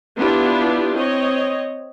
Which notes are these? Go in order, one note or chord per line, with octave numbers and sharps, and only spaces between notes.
B3 D4 E4 F4 G4
C4 C#5 D#5